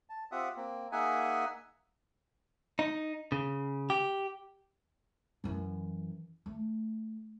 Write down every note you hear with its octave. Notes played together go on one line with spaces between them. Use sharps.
A5
C4 F4 G4 E5 F#5 D#6
A#3 C4
A#3 D#4 G#4 E5 F#5 G#5
D#4
C#3
G4
F#2 E3
A3